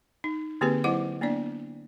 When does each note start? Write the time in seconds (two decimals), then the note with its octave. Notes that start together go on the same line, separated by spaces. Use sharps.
0.24 D#4
0.61 D3 A#3 C4 G4 G#4 B4
0.84 F#3 E4 C5 F#5 D6
1.21 A#3 B3 D4 D5